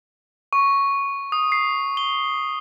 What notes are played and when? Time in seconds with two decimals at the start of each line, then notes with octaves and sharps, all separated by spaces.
0.53 C#6
1.32 D#6
1.52 C7
1.97 G7